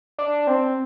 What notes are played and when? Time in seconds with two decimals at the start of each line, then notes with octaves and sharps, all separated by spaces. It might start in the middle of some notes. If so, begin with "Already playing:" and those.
0.18 D4
0.47 C4